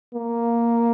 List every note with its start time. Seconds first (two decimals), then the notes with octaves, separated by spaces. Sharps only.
0.14 A#3